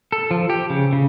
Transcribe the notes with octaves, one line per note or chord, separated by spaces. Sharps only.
A4
F3
G4
C#3
C#3